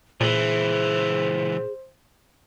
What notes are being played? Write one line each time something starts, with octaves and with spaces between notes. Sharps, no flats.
C#2 A#2 E3 G#4 C5